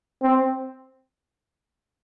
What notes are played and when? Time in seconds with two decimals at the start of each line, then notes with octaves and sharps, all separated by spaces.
0.22 C4